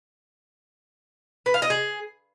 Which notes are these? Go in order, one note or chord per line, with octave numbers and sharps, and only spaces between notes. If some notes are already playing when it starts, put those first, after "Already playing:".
B4
F5
D#5
G#4